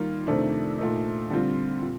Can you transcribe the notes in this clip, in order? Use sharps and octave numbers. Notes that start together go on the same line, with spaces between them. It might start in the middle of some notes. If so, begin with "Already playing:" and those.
Already playing: D#3 G3 A#3 F4
F2 C3 D#3 A3 D4
A#2 A3 D#4
D3 G3 C4 F4
A#2